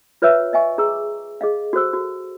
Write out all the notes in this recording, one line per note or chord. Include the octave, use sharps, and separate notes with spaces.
F4 B4 C#5 E5 E6
D#5 E5 G#5 C#6
G#4 A#5 D6 E6
G#4 D#5 F5
F#4 A4 C5 E6
F#4